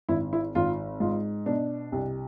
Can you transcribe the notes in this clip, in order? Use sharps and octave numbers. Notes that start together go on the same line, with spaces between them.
G#1 E4
E4
G#1 F4
G#2 F4
B2 D4
C2